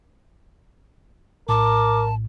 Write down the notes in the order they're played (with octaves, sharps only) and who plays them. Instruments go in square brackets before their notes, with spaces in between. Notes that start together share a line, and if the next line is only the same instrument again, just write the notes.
[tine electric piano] A#1 A2 [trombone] A#4 [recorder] A5 [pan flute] D6